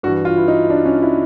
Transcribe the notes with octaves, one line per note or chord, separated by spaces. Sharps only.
G2 E3 F#4
F4
E4
D#4
D4
C#4
E4